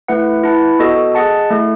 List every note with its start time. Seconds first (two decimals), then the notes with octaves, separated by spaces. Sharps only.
0.08 A3 E4 B4 F#5
0.43 E4 B4 F#5 A5
0.79 B3 F#4 A4 D#5
1.15 G#4 D#5 F#5 A5
1.51 A3 E4 A4